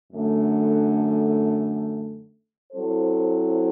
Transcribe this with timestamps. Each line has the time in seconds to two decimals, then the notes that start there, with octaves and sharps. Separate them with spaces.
0.11 F#2 D3 A3
2.72 F#3 C4 E4 A4 C5